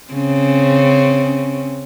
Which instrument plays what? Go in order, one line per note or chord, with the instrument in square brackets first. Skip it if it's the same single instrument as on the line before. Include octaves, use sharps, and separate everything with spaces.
[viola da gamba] C#3 C4 C#4